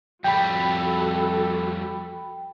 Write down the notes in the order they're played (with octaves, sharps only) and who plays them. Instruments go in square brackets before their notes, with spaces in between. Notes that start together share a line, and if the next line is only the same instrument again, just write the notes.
[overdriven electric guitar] F2 G3 [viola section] F#4 A4 [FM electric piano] G5 B5